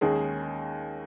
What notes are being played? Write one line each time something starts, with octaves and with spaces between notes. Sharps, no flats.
D#2 D#3 G#3 C#4 G#4